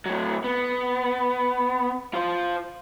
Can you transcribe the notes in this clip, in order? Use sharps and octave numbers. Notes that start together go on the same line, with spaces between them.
A2 F#3
B3
F4 C5